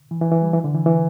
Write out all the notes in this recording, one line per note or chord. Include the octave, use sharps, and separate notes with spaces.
E3
E3
E3
G3
E3
D3
E3
E3